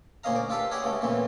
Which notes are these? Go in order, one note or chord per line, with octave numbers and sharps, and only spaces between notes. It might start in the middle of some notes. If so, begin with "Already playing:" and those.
D2 A#2 C#4 D#5 F5 A#5
D5
F4 G4 A4 B4 F5
G4 G#4 C#5 D#5 F#5
C#2 C#3 A3
A#2 C#3 E3 B3 C4